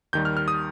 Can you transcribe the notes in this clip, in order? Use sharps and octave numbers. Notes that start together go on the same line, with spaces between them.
D#2 D#3 G3 G6
F6
F6
D#6